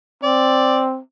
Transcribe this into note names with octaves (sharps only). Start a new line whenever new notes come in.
C4 D5